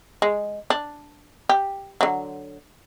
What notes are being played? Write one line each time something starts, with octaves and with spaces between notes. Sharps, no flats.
G#3
D4
G4
D3 F#3